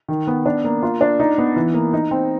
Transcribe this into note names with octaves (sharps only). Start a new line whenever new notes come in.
D#3
B3
D4
A#3
F4
D4
D#4
B3
E3
A#3
D#4
C4